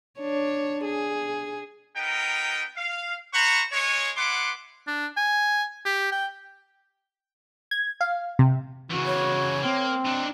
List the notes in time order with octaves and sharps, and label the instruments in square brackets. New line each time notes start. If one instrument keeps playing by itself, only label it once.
[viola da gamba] D4 C#5
G#4
[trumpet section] B3 D#4 A#4 G5
F5
C5 F#5 A#5 B5 C#6
G#3 C#5
B3 E4 F#5 C6 D6
[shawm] D4
G#5
G4
G5
[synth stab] G#6
F5
C3
[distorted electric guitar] C#3 E3 [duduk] F#4
[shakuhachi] C#5
[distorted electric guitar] A#3 [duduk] C4
[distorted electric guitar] D4 D#4